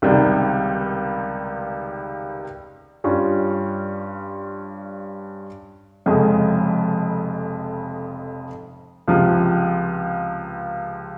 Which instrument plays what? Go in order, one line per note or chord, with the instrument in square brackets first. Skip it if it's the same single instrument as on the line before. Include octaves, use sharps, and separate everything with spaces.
[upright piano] C#2 C3 D#3 G3
G2 G3 C#4 F4
F1 F2 C#3 G#3
C#2 C3 F3